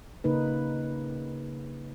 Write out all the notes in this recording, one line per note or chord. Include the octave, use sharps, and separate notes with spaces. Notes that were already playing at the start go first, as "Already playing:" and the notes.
C#3 A#3 D#4 B4